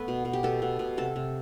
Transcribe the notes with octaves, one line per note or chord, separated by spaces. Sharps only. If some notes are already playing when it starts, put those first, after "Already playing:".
Already playing: A3 B3 A4 B4
B2
B2
G4
B2 A4
B2
B2
C3 A4
C3